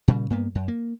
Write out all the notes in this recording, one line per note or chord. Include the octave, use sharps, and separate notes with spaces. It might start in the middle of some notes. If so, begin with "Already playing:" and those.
A#2 C#3 G3
G2 A#3 B3
F#2
A#3